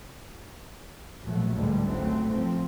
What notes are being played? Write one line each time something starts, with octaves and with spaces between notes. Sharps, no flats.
A#1 B2 F3 F#3 A3
A1 D2 A2 D3 G3 G#3
G#1 C#2 F#3 A3 C4
F3 C4